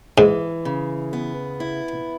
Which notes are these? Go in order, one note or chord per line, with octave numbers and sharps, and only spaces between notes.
G#2 E3
C#3
B3
E4